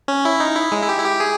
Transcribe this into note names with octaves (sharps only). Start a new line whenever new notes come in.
C#4
E4
D#4
E4
G#3
E4
G4
E4
G4
G#4